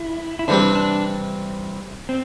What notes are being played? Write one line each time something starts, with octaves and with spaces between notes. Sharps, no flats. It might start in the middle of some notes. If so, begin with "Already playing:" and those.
Already playing: E4
E4
C3 E3 G3 C4 D4 G4
D4
C4